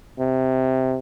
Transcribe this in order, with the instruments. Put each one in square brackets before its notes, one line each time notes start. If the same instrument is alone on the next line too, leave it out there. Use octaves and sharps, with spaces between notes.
[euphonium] C3